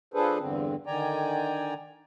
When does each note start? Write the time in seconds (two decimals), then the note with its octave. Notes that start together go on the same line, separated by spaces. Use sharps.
0.14 F3 D4 G#4 A4 B4 C5
0.40 E2 G2 D3 C4
0.87 D3 D#3 D5 G5 G#5 A#5